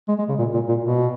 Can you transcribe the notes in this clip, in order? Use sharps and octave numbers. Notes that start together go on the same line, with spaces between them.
G#3
G#3
C#3
A#2
A#2
A#2
B2